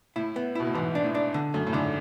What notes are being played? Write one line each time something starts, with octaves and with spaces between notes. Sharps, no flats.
A2 E4
B3
B2 E4
A2
G#2 E3
D4
A2
D4
D3
F#2 A3
A2
G#2 D3